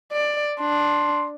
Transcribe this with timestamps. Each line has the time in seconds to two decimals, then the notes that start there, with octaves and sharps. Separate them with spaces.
0.12 D5
0.60 D4 C6